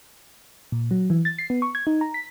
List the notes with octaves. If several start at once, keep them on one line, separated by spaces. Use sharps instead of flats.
A#2
F#3
E3
A6
C7
B3
C#6
G#6
D#4
A#5
B6